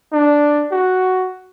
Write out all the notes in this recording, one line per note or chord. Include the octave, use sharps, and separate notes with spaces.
D4
F#4